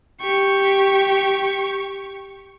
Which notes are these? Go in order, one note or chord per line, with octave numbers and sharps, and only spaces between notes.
G4 C#6